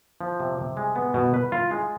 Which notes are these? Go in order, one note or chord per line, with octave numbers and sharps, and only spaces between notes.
F3
C3
C3
G#3
B3
B2
B4
F4
G#3